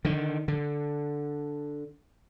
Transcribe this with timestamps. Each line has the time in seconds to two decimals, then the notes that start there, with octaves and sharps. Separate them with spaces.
0.05 D3 D#3
0.48 D3